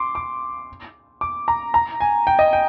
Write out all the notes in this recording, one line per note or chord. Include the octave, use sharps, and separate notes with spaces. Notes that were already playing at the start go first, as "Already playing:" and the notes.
Already playing: C6 D6
D6
D6
A#5
A#5
G#5
G5
D#5
G5